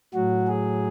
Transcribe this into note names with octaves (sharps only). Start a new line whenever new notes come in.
A2 F#3 F#4
G#4